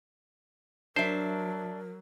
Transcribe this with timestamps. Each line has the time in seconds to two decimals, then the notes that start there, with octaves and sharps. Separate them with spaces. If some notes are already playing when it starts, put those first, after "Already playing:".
0.96 F#3 D4 A#4 C5 E5